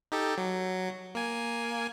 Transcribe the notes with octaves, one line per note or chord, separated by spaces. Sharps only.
D#4 G4 A4
F#3
A#3 G#5